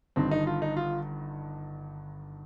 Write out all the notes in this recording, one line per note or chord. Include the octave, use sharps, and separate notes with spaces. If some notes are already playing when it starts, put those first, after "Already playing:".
G1 G2 D#3 C4
D#4
F4
D#4
F4